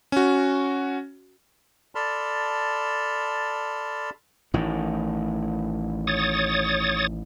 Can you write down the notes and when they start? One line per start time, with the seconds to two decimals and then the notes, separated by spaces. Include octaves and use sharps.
0.12 C#4 F#4
1.95 A4 D5 A5 B5 C6 F6
4.54 A1 A2 D#3
6.07 C#5 D#6 A6